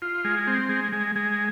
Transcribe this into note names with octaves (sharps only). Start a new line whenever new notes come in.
F4
G#3
C4
G#3
G#3
G#3